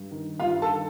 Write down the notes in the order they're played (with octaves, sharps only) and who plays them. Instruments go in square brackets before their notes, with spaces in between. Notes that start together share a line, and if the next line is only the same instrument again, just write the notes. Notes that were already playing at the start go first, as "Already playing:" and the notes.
Already playing: [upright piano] G2
D#3
G2 F4 F5
A4 A5
D#3